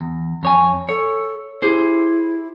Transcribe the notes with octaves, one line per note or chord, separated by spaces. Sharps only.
E2
F2 C#5 G#5
A4 C#5
E4 G4 G#4 C5